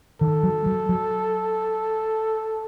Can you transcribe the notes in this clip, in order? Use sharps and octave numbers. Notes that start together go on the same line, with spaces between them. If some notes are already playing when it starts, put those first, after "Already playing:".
D#3 A4
F#3
F#3
F#3